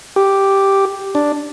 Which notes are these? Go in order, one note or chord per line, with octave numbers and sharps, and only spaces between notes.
G4
D4